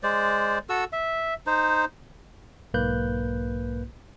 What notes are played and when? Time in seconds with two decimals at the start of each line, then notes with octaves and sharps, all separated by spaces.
0.03 G#3 C5 D5
0.69 F#4 A4 E6
0.93 E5
1.47 D#4 C5
2.74 B1 G#2 A#3 B4 F#6 G6